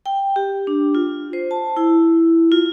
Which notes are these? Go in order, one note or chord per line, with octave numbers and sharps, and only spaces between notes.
G5
G4
D4
F4
C5
A5
E4
F4